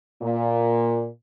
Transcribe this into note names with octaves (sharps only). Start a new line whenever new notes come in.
A#2